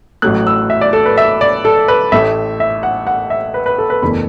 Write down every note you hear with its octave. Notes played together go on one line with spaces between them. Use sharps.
A1 A2 F#3 A3 F#6
E6
E5
D5
A4
B4
E5
D5
A4
B4
A1 A2 A3 E5
E5
F#5
F#5
E5
B4
B4
A4
B4
F#1 E2 E3 A3 B5